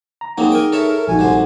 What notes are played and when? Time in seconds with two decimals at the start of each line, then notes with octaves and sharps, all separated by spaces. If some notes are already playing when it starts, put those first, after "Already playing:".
0.21 A#5
0.38 F#3 A#3 C4 D#4 G#4
0.52 A#4 G5 G#5
0.72 A4 C#5 E5
1.08 A#1 D#4 F#4 G#5
1.19 C2 D3 C5